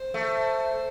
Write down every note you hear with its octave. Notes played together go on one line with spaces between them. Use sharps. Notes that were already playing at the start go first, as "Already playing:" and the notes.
Already playing: C5
A3